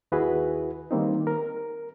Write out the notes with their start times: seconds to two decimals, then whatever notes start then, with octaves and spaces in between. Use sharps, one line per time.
0.12 D#2 E4 F#4 G#4 B4
0.91 D#3 G3 A#3 C4 D#4
1.27 A#4